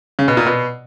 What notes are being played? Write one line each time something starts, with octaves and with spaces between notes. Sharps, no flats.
C#3
B2
A#2
B2